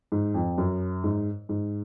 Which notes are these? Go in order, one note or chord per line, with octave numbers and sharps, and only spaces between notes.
G#2
F2
F#2
G#2
G#2